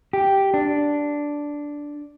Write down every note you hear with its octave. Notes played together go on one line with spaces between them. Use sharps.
G4
D4